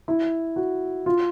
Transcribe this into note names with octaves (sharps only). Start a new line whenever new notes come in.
E4
F#4
F4